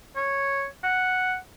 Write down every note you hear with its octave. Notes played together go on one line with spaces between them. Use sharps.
C#5
F#5